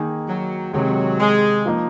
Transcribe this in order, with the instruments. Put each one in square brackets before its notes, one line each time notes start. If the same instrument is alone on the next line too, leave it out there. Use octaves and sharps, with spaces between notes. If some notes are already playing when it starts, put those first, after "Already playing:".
Already playing: [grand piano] D#3 A#3 D#4 G#4
[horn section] F#3
[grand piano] C3 D#3 G#3 [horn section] F#3
[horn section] G#3
[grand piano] F3 A#3 D#4